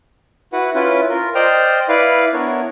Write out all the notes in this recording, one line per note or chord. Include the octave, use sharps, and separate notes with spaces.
E4 F#4 B4 F#5
C#4 E4 F4 B4
F4 A#4
C5 D5 D#5 G5 F6
E4 B4 D5 F5
B3 D4 E4 A#4 C#5